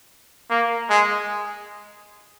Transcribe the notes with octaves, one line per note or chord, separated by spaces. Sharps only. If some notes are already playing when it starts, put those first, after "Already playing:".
A#3
G#3